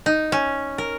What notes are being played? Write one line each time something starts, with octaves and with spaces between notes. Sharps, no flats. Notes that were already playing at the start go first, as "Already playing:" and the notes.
D#4
C#4
A#4